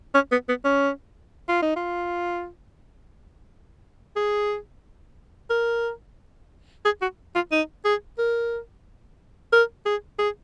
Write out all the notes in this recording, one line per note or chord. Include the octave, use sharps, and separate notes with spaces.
C#4
B3
B3
C#4
F4
D#4
F4
G#4
A#4
G#4
F#4
F4
D#4
G#4
A#4
A#4
G#4
G#4